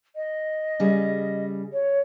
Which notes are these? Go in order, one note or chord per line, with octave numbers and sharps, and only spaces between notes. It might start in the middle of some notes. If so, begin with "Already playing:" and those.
D#5
C#3 G3 G#4
C#5